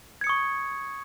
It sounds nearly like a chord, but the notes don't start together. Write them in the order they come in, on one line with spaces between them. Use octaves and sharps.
G#6 C#7 D#6 C#6